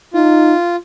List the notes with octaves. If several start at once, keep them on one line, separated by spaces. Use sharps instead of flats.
D#4 F4